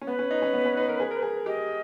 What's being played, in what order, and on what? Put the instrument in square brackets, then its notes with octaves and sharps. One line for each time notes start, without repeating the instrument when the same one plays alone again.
[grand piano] C#4
[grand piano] B3 [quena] B4
[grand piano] C#4
D#4
C#4
B3
C#4
D#4
A#4
G#4
A#4
G#4
[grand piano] G4 [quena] D#5